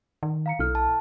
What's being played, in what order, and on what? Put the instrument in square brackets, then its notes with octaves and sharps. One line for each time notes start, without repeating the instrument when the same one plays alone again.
[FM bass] D#3
[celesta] F5 A#5 C#7
[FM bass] B1 [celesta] E4 A4 F6
[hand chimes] A5